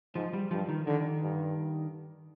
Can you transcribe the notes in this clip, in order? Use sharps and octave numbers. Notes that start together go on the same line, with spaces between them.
G#2 F3
G3
G2 F3
D#3
D3 D#3
G2